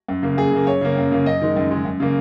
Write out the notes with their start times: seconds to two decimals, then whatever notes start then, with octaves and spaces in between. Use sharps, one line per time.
0.08 F#2
0.23 C#3 A#3
0.37 F#2 G#4
0.52 C#3 A#3
0.67 F#2 C#5
0.81 C#3 A#3
0.97 F#2
1.12 C#3 A#3
1.26 F#2 D#5
1.41 D#3 G#3
1.56 F#2
1.71 D#3 G#3
1.85 F#2
2.00 C#3 A#3